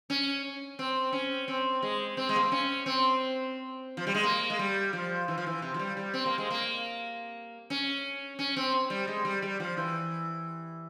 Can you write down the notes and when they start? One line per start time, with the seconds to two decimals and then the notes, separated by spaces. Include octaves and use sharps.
0.10 C#4
0.79 C4
1.12 C#4
1.48 C4
1.83 G#3
2.17 C4
2.29 G#3
2.36 A#3
2.43 C4
2.52 C#4
2.86 C4
3.97 F3
4.07 G3
4.14 G#3
4.24 A#3
4.50 G#3
4.59 G3
4.93 F3
5.28 E3
5.38 F3
5.47 E3
5.62 C3
5.74 F3
5.79 G3
5.97 G3
6.14 C4
6.26 A#3
6.38 G#3
6.50 A#3
7.70 C#4
8.39 C#4
8.57 C4
8.90 G3
9.08 G#3
9.25 G3
9.42 G3
9.60 F3
9.77 E3